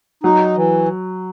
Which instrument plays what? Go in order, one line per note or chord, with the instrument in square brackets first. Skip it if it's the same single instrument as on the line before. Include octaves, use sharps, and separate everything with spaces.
[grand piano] F#3 [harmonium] D#4
[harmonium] E3